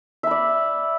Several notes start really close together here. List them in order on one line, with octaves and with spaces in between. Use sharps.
E5 B5 D5